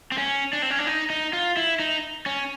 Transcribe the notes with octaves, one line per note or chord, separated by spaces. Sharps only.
C4
C#4
D4
C4
C#4
D4
D#4
D#4
F4
E4
D#4
C#4